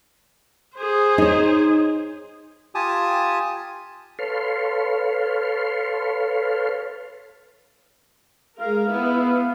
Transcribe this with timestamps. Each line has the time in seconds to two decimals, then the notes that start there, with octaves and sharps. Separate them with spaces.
0.76 G#4 C5
1.18 D#4 C#5
2.75 F4 G4 G#5 A5 D#6
4.19 A4 B4 C#5 F5 C6
8.60 G#3 A#4 F5
8.92 B3 E4